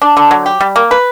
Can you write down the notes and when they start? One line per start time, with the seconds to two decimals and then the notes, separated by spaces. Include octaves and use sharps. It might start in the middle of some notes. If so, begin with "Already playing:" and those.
0.02 D4
0.17 D3
0.31 F#3
0.46 G4
0.61 G3
0.76 A#3
0.91 B4